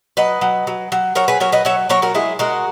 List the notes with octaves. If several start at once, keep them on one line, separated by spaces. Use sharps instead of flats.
F#3 B4 D#5
F#3
F#3
F#3
F#3 A#4 C#5
G#4 B4
F#3 A#4 C#5
B4 D#5
F#3 C#5 E5
F#3 A#4 C#5
F#4 A#4
G#3 E4 G#4
G#3 F#4 A#4